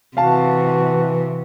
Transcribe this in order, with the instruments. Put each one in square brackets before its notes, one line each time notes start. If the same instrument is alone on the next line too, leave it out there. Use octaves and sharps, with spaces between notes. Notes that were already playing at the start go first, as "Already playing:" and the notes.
[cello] C3 [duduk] E3 [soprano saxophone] F#4 [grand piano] F5 A5